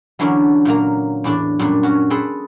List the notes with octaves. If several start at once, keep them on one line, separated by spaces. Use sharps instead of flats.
D3 E3 F#3 C#4 D4
A#2 F#3 A#3 A#5
E2 A2 D4 D5
F#2 A#2 G3 B3 D4
C#4 F#4
G#4 A4 B4 C5 G5